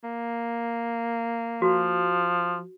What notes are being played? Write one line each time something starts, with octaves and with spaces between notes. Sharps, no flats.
A#3
F3 F#4